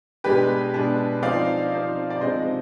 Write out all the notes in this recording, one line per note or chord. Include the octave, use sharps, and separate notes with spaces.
B2 G#3 D4 G4 B4
B2 G#3 D4
F3 C4 D#4 D5 F5
F3 C4 D#4
D5
C3 F3 G#3 C4 D#4 C5 D#5